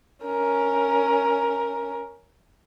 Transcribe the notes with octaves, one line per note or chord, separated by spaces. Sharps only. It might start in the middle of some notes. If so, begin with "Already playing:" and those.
C#4 A#4